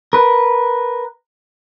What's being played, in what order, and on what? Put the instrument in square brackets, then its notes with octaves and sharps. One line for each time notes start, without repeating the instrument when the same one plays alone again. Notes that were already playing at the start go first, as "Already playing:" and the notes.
[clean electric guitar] A#4 B4